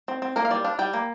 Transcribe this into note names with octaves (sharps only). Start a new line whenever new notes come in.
C4
C4
A#3 A#4
F5
G3 D5
D4 F5
G3 G5
A#3